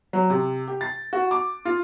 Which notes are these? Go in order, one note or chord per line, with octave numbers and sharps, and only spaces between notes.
F#3
C3
G4
A6
F#4
D6
F4